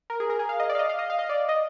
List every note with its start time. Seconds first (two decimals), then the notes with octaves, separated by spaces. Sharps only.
0.10 A#4
0.20 G#4
0.30 A#4
0.39 G#4
0.49 F5
0.60 D#5
0.69 D5
0.75 F5
0.79 D#5
0.89 F5
0.99 D#5
1.10 F5
1.19 D#5
1.29 D5
1.49 D#5